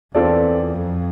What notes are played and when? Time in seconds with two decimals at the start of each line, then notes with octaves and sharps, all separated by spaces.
0.15 E2 C4 F4 A4 D5
0.74 F2